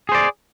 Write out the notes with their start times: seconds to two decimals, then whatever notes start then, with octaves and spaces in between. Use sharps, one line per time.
0.09 G#4
0.12 C5
0.15 D5